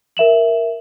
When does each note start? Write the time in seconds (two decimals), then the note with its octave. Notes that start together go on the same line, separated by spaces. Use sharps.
0.17 A#4 E5 E7 F#7